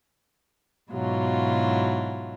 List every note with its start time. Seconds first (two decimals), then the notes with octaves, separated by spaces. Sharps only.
0.92 G#2 B2 F#3 E4 F4